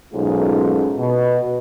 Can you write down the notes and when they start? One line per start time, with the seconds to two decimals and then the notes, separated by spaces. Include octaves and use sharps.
0.14 B1 G#2 A3 C#4 F4 G#4
0.97 B2